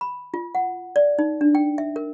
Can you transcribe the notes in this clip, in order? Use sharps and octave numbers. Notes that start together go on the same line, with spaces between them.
B5
F4
F#5
D5
D#4
D4
G5
E5
A#4